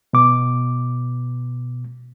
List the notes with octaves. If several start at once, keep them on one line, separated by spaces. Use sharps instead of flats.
B2 D6